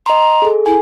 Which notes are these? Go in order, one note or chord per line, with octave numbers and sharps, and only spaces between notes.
D#5 A#5 C6
G#4 A4
E4 G#5